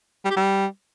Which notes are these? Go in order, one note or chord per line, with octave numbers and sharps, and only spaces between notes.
G3
G4
G3